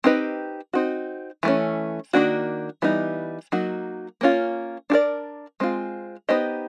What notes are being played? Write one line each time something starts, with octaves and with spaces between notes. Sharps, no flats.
C4 D#4 G4 B4 D#5
C4 D#4 F#4
E3 A3 C#4
D#3 G3 A#3 D4 F#4
E3 G3 B3 D#4
F#3 A#3 D#4 F#4
A#3 C#4 F4
D4 F#4 A#4 D5
G#3 C4 F4
B3 D#4 G4 C5 D#5